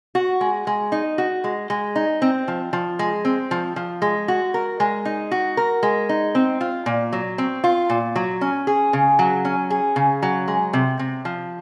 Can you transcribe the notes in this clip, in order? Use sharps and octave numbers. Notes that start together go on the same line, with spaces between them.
F#4
G#3
G#3
D#4
F#4
G#3
G#3
D#4
C4
F3
F3
G#3
C4
F3
F3
G#3
F#4
A#4
G#3
D#4
F#4
A#4
G#3
D#4
C4
F4
A#2
F#3
C4
F4
A#2
F#3
C#4
G#4
C#3
F#3
C#4
G#4
C#3
F#3
G#3
C3
C3
F3